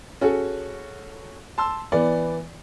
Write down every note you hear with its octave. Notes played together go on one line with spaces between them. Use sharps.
C#4 F#4 G#4 A4
A5 C6 E6
E3 B3 D5